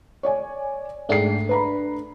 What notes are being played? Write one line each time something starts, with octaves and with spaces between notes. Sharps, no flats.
C#5 D5 G#5
G#2 A3 D4 G5 C7
B4 A#5 B5